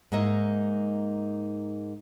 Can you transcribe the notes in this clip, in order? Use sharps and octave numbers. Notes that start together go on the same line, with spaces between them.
G#2 G#3 A#3 D#4 D#5 E5